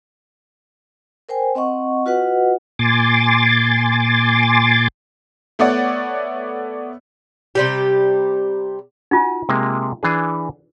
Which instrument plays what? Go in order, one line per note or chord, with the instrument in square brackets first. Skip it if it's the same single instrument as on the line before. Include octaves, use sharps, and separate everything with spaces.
[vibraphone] A#4 C5 G5 G#5
C4 D#5 F#5 C#6
F4 F#4 B4 D#5 F#5
[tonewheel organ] A#2 G#5 C6 D6 A6
[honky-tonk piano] A3 B3 C#5 D5 F#5
[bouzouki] C3 G3 G4
[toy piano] D#4 F4 [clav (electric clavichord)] F#4 G#5
[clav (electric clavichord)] C3 G#3 A#3
E3 D4 G#4